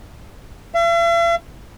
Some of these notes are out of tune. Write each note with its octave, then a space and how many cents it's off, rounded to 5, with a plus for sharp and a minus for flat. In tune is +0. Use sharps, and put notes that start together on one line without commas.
E5 +45